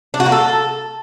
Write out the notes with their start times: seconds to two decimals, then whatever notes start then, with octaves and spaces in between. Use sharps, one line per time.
0.14 D4
0.20 F#4
0.26 A#3
0.32 A4